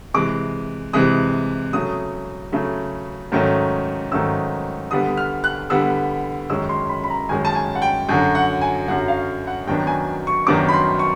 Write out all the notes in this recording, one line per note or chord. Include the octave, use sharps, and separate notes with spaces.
C3 E3 G#3 D6
C3 E3 G#3 D#6
C#3 F#3 A3 D#6
C#3 F#3 A3
G#2 D#3 F#3 A3 C#4
G#2 D#3 F#3 A3 C#4 E6
D3 G3 B3 D#6
F6
F#6
D3 G3 B3 E6
F#2 D#3 G#3 C#4 E6
C6
B5
B5
A#5
F#2 D#3 G#3 C#4 G#5
A5
G#5
F#5
G5
F#2 D3 F#3
F#5
G#5
F#2 D3 F#3 F#5
F5
F#5
F#2 D#3 F#3 B3 D4 G5
G#5
C#6
F#2 D#3 F#3 B3 D4 D6
B5
C6
C#6